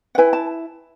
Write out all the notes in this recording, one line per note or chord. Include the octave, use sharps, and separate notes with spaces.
F#5
E4 B4 G#5
A5